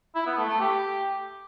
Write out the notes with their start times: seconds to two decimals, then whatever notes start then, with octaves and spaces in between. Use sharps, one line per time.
0.15 E4
0.26 B3
0.37 A3
0.49 A3
0.60 G4